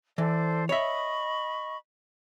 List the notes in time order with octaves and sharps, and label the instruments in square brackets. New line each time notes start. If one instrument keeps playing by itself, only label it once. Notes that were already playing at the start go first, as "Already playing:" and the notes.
[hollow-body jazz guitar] E3 [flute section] A4 C5 D5
[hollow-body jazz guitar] C#5 E5 [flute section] D#5 B5 C#6